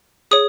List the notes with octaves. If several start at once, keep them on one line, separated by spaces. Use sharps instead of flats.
G#4 C#5 D#6